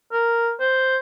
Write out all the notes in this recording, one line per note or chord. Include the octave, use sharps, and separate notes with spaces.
A#4
C5